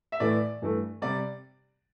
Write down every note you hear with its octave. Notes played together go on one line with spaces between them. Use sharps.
E5
A2 E3 A3 D5
G2 E3 A3
C3 G3 D5